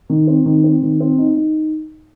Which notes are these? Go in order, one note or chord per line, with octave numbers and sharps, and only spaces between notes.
D#3
C4
D#3
C4
D#3
C4
D#4
D#4